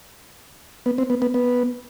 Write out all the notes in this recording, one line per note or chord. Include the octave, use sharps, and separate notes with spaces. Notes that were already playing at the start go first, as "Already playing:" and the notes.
B3
C4
B3
B3
B3